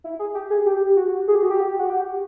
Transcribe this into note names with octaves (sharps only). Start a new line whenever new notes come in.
E4
G#4
G4
G#4
G4
F#4
G#4
G4
F#4
G4
F#4
G4